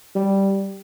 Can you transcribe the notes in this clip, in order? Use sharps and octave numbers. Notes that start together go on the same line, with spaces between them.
G3